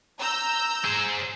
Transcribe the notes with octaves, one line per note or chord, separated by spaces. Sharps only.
A#5 E6 G6
G#4 C5